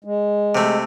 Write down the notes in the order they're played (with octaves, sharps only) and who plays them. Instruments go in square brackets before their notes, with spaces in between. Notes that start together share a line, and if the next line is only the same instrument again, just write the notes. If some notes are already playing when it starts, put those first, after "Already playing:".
[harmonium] G#3
[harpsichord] C3 A3